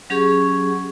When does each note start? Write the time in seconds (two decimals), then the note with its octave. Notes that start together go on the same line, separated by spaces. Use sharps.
0.10 F#3 C#4 G4 G#4 C#6